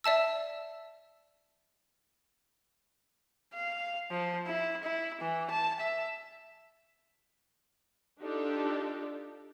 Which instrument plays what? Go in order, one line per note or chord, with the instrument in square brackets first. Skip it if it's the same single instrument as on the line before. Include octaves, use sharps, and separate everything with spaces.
[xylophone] D5 E5 A5 E6
[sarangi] F5
F3
E4
E4
E3
A5
E5
[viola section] D4 D#4 F4 G4 A4